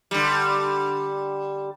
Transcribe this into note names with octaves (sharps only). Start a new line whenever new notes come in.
D3 G3